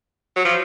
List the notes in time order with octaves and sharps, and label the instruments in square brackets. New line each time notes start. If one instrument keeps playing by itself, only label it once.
[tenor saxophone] F#3
F3